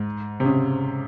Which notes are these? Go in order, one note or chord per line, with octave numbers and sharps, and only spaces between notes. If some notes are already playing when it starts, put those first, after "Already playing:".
Already playing: G#2
C3
C#3